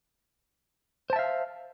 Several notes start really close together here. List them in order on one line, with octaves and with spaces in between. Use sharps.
C5 A5 E5 F5